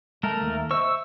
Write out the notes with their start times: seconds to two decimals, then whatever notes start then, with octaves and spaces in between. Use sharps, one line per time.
0.23 G#3 A3 A#4 A5
0.41 D#2
0.71 C5 D#5 E5 C#6 E6